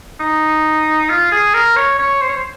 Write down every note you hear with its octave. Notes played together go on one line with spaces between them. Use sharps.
D#4
F4
G#4
A#4
C#5
C#5
C5
C#5
C5